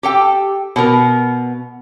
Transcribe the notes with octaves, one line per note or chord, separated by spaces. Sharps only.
G4 A4 G5
B2 B3 A#4